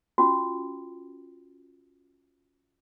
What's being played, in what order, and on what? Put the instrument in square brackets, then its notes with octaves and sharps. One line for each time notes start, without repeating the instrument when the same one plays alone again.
[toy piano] C#4 F4 F#4